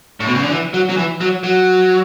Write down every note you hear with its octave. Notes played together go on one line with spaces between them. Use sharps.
A2
B2
C#3
D3
E3
F#3
F#3
E3
F#3
F#3